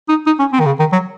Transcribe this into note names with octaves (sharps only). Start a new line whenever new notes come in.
D#4
D#4
C#4
C4
D#3
C#3
D#3
F#3